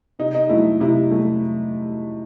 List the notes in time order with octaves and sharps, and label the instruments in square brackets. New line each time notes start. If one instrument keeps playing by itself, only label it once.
[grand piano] C3 D#4
D#4
F#3 A3 E4
C3 E4
F#3 A3